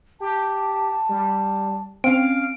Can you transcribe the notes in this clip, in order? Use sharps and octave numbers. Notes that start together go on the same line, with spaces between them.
G4 A5
G3
C4 C#4 F5 D7